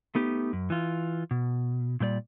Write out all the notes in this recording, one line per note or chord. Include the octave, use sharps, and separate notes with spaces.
A3 B3 D#4 G4
F#2
E3 F4
B2
A#2 G3 C5 D5